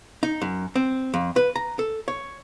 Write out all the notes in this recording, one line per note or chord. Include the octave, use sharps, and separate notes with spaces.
D#4
F#2
C4
F2
B4
A#5
A4
C#5